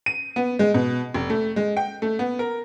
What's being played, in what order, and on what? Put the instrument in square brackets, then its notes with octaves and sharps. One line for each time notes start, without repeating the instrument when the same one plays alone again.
[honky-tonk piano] D#7
B3
G#3
B2
F1
A3
G#3
G5
A3
B3
A#4